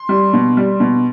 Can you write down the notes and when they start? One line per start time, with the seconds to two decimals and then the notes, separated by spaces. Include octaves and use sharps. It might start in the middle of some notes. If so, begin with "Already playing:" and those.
Already playing: C6
0.09 G3
0.33 B2
0.57 G3
0.80 B2